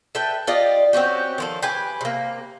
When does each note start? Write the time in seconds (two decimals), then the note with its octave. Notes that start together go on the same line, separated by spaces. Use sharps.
0.15 A4 B4 E5 G5
0.47 F4 G4 D5 D#5
0.93 C4 C#4 F#4 G4
1.38 D#3 F3 A4
1.62 G4 B4 G#5
2.01 C3 A#3